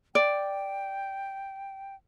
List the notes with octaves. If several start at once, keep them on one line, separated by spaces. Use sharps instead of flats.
D5 G5